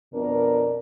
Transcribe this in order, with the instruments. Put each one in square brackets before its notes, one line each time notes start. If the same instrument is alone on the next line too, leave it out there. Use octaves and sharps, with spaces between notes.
[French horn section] F2 B2 D4 A#4